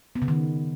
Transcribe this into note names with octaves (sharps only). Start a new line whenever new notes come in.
B3
C#3
D#3